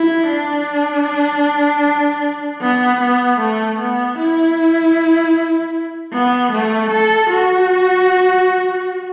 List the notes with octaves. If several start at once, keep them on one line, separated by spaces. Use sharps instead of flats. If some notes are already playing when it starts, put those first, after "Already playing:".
Already playing: E4
D4
B3
B3
A3
B3
E4
B3
A3
A4
F#4